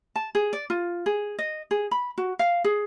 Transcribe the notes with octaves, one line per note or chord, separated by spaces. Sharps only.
A5
G#4
D5
F4
G#4
D#5
G#4
B5
F#4
F5
G#4